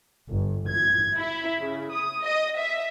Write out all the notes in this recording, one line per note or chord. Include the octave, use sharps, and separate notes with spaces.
G1
G#6
E4
C#3
D#6
D#5
E5